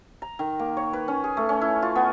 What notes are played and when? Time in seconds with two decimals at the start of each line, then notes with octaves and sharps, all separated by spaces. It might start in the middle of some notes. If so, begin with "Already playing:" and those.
0.22 A#5
0.39 D#3
0.59 A#3
0.77 C#5
0.93 B4
1.08 C#4
1.24 G#4
1.37 A3
1.49 C#4
1.62 E4
1.82 F4
1.96 B3